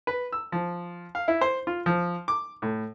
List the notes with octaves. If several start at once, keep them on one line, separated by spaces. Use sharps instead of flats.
B4
E6
F3
F5
E4
C5
F4
F3
D6
A2